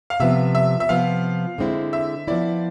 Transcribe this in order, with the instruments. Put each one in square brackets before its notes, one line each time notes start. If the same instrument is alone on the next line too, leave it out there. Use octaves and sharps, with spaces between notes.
[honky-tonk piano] F5
[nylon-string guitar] C3 F3 B3 [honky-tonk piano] E5
[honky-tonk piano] E5
E5
[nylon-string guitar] C3 F3 B3 [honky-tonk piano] F5
[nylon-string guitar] D3 G#3 C4 E4
[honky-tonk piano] E5
[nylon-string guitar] F3 B3 E4 [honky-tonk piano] D5